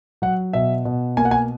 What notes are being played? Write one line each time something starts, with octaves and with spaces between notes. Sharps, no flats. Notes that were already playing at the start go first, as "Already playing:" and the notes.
F#3 F#5
B2 E5
B2
A#3 G#5
F#5
G#5